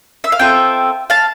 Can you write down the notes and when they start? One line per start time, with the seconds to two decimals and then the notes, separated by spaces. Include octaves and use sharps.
0.24 E5
0.32 F5
0.39 C4 F4 A4 E5 G5
1.10 F5 A5